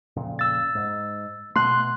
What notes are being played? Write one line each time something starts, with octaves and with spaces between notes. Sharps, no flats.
F2 A#2 C#3
E6 A6
G#2
B2 A3 C6 F#6